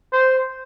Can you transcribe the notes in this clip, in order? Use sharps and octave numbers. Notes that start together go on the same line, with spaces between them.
C5